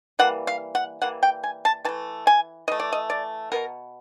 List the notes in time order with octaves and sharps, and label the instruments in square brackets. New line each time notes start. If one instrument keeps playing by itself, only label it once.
[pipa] E3 G3 A#3 F#5
F5
F#5
E3 G3 A#3 F#5
G5
G#5
A5
E3 A5
A3
G#5
E3 A3 D#5
D5
D#5
D5
B2 F#3 B3 A#4